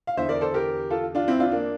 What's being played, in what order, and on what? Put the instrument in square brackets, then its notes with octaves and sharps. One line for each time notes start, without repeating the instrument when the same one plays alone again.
[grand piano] F5
E2 D3 C5 E5
A#4 D5
A4 C5
G4 A#4
F4 A4
D4 F4
C4 E4
D4 F4
A#3 D4